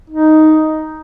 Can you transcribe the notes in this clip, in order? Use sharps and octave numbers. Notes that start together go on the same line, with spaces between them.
D#4